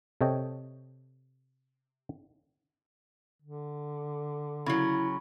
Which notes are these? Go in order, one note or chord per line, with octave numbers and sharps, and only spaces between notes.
C3 A4 C#5 D#5 G5
D3
C#3 F#3 E4 B5 C#6